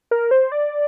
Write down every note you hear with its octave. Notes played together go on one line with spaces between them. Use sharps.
A#4
C5
D5